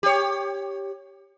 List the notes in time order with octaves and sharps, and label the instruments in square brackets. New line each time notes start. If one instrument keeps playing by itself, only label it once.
[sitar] G4 C#5